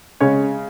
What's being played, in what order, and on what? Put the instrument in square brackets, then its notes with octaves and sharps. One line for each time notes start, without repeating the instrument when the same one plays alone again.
[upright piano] C#3 G#3 C#4 C#5